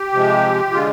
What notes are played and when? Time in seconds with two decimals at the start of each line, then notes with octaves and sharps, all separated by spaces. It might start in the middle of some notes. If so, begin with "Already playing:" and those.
Already playing: G4
0.13 C3 F3 G#3
0.72 D3 G#3 F4